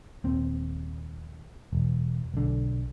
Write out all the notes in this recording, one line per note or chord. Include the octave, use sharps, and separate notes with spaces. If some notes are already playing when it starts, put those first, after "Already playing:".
D#1 C4
E1
B1 D3